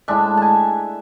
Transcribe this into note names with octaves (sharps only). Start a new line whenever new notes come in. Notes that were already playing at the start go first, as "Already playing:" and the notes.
A2 G#3 D4 E5
G#5 A5